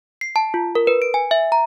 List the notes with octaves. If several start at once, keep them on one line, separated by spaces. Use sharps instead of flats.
C7
A5
F4
A#4
B4
D7
G#5
E5
A#5